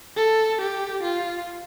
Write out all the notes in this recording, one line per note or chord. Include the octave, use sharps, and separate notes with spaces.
A4
G4
F4